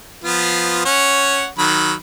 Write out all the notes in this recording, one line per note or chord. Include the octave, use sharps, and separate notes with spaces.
F3 B3 F4
C#4 C#5 F#5
D#3 F#3 B5